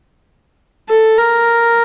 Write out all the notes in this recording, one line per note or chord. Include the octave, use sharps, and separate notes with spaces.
A4
A#4